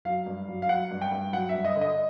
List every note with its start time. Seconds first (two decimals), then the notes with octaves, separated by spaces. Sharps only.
0.05 F#3 F5
0.26 G2
0.48 F#3
0.62 F5
0.69 F#3 F#5
0.91 G2
1.02 G5
1.12 G2
1.33 F#3 F#5
1.49 E5
1.55 G2
1.65 D#5
1.76 D3
1.81 D#5